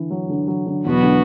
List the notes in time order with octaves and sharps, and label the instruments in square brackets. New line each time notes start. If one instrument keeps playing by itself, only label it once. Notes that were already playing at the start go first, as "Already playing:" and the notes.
Already playing: [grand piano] D3 E3
F#3
D3
F#3
D3
[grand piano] E2 [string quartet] B2 F#3 B3 F#4 B4
[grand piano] D3